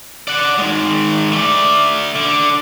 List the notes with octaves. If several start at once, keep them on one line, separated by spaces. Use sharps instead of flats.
D5 F#5
D#3 G#3
A3 D5
D3